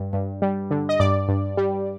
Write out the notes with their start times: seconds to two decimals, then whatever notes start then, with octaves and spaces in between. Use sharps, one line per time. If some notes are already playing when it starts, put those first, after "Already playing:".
Already playing: G2
0.13 G2
0.42 G3
0.71 D3
0.89 D#5
1.00 G2 D5
1.28 G2
1.57 G3